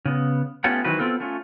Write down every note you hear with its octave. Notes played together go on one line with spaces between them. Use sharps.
C#3 B3
A3 B3 C#4 F4 G4 F#5
D#3 E3 F#3 F#4 B4 C5
B3 C4 F4 A4
A3 C#4 F4